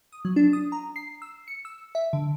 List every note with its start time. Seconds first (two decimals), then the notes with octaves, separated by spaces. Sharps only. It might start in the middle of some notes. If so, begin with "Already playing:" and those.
0.12 D#6
0.25 F#3
0.36 D4
0.53 D#6
0.72 A#5
0.96 C7
1.22 E6
1.48 C#7
1.65 E6
1.95 E5
2.13 D3